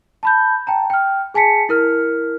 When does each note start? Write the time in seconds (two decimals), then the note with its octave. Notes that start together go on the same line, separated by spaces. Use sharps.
0.23 A5 B5 G6
0.67 G5 A5 A#5
0.90 G5 F6
1.34 G#4 G#5 A5 B6 C#7
1.69 E4 A#4 F6